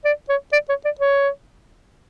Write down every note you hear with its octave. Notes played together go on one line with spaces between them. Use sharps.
D5
C#5
D5
C#5
D5
C#5